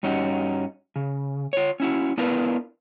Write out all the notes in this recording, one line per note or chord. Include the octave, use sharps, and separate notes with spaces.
G2 C#4 D#4 F#4
C#3
F4 C#5
C#4 E4 F#4
B3 D4 E4 F4 A#4 B4